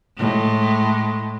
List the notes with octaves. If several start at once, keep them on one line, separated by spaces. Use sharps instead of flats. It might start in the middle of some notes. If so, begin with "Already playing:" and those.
A2 G#3